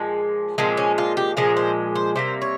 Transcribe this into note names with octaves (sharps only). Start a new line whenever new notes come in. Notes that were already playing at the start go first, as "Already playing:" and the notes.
Already playing: A#2 F3 G#3
A#2 F3 G#3 C4
C#4
F4
G4
A#2 F3 G#3 A#4
C5
C5
C3 G3 A#3 C5
C#5